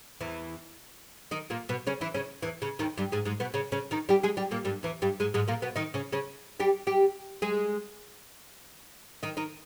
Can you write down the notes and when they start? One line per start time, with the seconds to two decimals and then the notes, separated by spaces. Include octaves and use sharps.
0.20 E2 E3
1.31 D#3 D#4
1.50 A#2 A#3
1.69 B2 B3
1.87 C#3 C#4
2.01 E3 E4
2.14 C#3 C#4
2.42 E2 E3
2.62 C#3
2.79 D#2 D#3
2.97 G2 G3
3.12 G#2 G#3
3.25 G#2 G#3
3.40 B2 B3
3.54 C#3 C#4
3.72 C#3 C#4
3.91 D#3 D#4
4.09 G3 G4
4.23 G#3 G#4
4.37 G3 G4
4.51 A#2 A#3
4.65 G2 G3
4.83 E2 E3
5.02 G2 G3
5.20 G#2 G#3
5.34 G#2 G#3
5.48 A#2 A#3
5.62 B2 B3
5.76 D#3 D#4
5.94 C#3 C#4
6.12 C#3 C#4
6.60 G3 G4
6.87 G3 G4
7.42 G#3 G#4
9.23 D#3 D#4
9.37 D#3 D#4